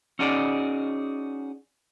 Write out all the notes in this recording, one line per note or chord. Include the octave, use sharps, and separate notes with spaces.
C#4 D#4 F#4 G#4 D5